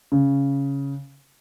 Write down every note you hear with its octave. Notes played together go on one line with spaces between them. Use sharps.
C#3